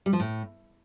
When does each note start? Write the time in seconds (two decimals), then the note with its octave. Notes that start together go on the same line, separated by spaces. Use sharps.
0.06 G3
0.13 F3
0.20 A2